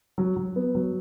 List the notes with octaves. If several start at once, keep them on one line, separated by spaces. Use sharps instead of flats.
F#3
F#3
B3
F#3